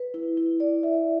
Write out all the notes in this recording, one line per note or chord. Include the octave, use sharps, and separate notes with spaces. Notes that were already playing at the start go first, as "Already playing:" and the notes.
Already playing: B4
E4
E4
D5
E5